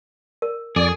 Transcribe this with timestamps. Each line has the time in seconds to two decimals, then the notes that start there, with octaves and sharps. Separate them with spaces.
0.42 A#4
0.76 F2 G#4 A4 D5